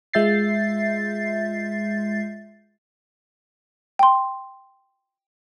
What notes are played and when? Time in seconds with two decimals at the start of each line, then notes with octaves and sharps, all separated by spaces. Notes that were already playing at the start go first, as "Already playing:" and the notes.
0.13 G#3 F4 E5 G6 A6 C7
3.99 G5 C6